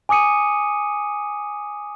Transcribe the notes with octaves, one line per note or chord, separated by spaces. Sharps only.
G#5 D6 D#6 C#7 D#7